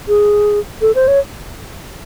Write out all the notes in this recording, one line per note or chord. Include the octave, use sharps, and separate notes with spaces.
G#4
A4
C5
C#5